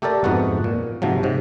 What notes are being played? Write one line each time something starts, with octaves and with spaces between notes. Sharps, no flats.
A3 G4 A4 A#4 D5
F2 G#2 B3 F#4 F#5
A#2
G#2 C3 F3 F#3
G#2 C3